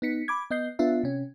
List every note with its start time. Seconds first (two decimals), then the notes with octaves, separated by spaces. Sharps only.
0.02 B3 D#4 B6 C#7
0.28 B5 D6 G#6
0.51 B3 D#5 G6 C7
0.79 B3 D4 F4 E5
1.03 C3 C#4